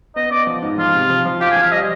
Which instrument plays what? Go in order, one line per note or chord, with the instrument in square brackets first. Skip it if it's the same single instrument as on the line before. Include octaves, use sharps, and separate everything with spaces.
[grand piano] B3 [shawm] D#5
[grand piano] B3 [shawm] D5
[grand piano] F3
G#2
[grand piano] F3 [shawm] F4
[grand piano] C3
F3
F3
[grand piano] F4 [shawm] G4
[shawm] G#4
[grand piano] F3
[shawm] F5
[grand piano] G3 [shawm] D#5